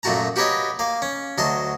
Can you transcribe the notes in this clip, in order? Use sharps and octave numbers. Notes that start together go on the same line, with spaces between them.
F#2 A#2 A3 F#4 A5 A#5
F#4 G4 A#4 B4 C#5 D#5
A#3 F5
C#4
D2 F#3 D#5 A5 C6